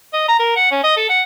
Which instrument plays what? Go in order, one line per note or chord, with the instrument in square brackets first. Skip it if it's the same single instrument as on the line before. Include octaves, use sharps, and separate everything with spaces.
[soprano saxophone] D#5
A#5
A#4
F#5
C#4
D#5
A4
F#5